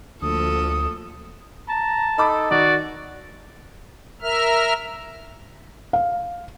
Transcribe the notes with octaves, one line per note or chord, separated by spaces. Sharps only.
D2 F3 A#3 A4 D#6
A5 A#5
D#4 A4 B5 D6
D#3 F#4 D5
A#4 E5 F6
F5